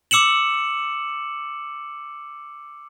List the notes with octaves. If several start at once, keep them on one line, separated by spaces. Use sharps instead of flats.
D6 E6 C#7 E7 F#7